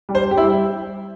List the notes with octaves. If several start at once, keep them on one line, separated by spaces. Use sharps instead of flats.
G3
C5
G3 G4
E4
G3